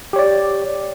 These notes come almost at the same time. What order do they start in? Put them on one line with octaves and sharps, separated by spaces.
G4 C#5 D5